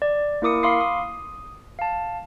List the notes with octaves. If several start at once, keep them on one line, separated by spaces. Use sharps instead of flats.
D5
A#3 E4 A#4 D6 D#6 C#7
F5 B5 C6 D6 D#6 C7
D#6
F5 A5